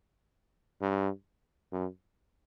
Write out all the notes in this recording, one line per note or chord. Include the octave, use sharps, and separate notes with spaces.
G2
F#2